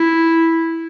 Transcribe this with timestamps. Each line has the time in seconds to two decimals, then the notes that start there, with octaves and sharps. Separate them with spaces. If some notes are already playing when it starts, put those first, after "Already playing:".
Already playing: E4